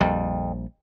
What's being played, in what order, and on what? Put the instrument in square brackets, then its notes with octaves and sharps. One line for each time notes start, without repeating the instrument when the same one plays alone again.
[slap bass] A#1 G3 [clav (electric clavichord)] F2